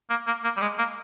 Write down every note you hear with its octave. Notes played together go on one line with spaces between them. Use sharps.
A#3
A#3
A#3
G3
G#3
A#3